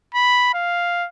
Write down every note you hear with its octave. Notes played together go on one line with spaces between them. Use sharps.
B5
F5